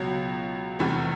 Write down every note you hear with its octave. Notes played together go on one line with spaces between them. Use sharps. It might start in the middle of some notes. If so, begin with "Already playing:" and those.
Already playing: C#2 B2 F#3
F1 E2 C3 E3 A3